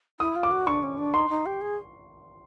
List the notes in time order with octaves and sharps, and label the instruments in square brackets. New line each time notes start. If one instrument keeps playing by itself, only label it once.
[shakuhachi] E4 [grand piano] D#6
[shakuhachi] F4
[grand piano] D6
[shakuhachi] F#4
[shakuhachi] D4 [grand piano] C#6
[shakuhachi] C#4
D4
[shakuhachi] D#4 [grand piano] C6
[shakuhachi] D#4
G4
G#4